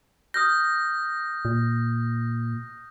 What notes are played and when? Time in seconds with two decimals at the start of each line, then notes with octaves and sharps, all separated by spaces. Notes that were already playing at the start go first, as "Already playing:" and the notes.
0.34 D#6 F6 G6 A#6
1.45 A#2